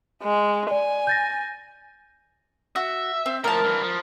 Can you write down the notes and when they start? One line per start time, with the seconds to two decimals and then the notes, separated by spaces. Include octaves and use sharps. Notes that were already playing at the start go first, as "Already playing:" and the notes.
0.23 G#3
0.71 D5 G#5
1.07 G6 A6 A#6
2.76 F#4 E5
3.26 C4
3.44 A2 F3 A#4 A5
3.64 G2 E3
3.83 F3